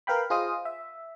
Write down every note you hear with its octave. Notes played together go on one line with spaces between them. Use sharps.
A#4 B4 F5 G5 B5
F4 G#4 C5 D#5 F5 D#6
E5